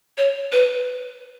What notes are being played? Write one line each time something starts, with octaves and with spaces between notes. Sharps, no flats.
C#5
B4